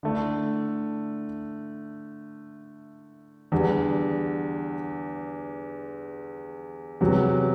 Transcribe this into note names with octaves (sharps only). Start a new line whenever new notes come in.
D3 A3 E4
E2 D3 G3
E2 C3 F#3